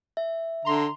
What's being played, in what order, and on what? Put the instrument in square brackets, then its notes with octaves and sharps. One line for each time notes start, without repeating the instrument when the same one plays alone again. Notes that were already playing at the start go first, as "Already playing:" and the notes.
[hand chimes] E5
[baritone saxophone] D3 [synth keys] A#5 C6